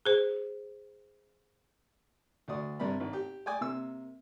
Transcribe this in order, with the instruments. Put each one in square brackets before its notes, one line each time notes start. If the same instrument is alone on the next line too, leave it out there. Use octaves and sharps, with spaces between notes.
[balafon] G#4 C5
[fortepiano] D2 F#4 D5 D#6
G2 C3 A#4 D5 B5
G#1
G4
D5 G5 G#5 D6 D#6
C3 A#3 E6